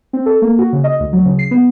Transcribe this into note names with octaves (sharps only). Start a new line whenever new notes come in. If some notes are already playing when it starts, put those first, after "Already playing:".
C4
A4
A#3
F#4
C#3
D#5
D2
F#3
C#3
C7
B3